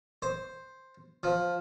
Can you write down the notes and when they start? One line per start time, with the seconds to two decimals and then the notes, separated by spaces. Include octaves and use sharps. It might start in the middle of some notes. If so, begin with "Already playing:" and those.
0.22 C5
1.23 F3